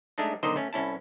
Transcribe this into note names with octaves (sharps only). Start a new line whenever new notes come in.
G#3 A3 D4 D#4
B1 D3 D#3 D#4 C5 D#5
A3 C#4
C2 C#4 E4 A5